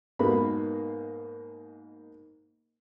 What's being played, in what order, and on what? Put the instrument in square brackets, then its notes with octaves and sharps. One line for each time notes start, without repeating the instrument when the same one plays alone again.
[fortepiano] G#2 B2 A#3 A#4 B4 B5